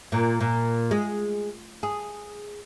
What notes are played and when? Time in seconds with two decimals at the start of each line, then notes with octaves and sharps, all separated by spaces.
0.12 A#2
0.41 A#2
0.91 G#3
1.83 G#4